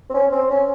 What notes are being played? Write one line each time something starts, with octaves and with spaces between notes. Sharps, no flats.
C4
C#4
C4
C#4